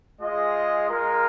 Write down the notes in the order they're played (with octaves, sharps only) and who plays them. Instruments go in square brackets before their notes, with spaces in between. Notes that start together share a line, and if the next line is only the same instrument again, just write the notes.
[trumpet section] G#3 F4 G#4 D#5
G#3 F4 A#4